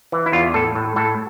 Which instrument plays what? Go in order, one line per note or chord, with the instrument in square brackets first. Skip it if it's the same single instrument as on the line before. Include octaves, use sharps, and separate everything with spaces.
[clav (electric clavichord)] E3
E4
E2 F4
A2 A4
A2
A2 A4